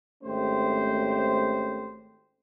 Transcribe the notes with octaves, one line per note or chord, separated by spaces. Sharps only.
G#1 A3 C#4 G4 C5